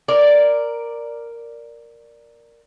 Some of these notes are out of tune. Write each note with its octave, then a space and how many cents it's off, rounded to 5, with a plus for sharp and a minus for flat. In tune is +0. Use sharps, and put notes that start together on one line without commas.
A#4 +0 D5 +0